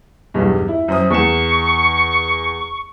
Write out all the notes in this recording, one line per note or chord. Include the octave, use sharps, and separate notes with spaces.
B1 E2 G2
E4
F#2 C5 D#6
E2 C#6 E7